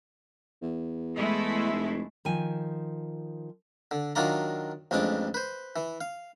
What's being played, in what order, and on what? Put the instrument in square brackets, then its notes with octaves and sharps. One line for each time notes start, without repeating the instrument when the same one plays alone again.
[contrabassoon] E2
[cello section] G#3 A3 E4
[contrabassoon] F1
[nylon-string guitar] D#3 F3 G#5
[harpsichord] D3
D#3 F#3 D4 F4 D5 A#5
A1 F2 G#3 D4 D6
B4 C5
E3
F5